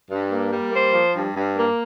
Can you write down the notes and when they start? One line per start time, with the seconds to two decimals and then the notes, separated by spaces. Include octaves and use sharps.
0.10 G2
0.31 A#3
0.52 G3
0.72 A#3 C5
0.93 F3
1.14 G2
1.34 G2
1.56 A#3